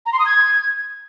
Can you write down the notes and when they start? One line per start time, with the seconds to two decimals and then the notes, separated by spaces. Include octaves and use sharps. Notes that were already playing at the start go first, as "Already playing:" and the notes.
0.06 A#5
0.13 C6
0.19 D#6
0.26 G#6